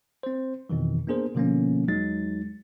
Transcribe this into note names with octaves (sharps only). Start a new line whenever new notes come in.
C4 C5
F2 B2 D#3 E3
A#3 B3 D4 G#4 A#4 C5
B2 D3 F3 A#3 B3 C#4
E2 F#3 G#3 D#4 A6